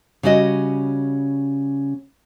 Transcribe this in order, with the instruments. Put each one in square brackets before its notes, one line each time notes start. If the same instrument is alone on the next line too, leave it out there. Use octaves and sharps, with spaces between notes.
[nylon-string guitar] C#3 G3 C#4 F#4 D#5